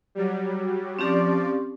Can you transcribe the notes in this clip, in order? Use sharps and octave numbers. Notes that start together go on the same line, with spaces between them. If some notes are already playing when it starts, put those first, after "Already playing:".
F#3 G3
F3 C4 C#4 G4 D5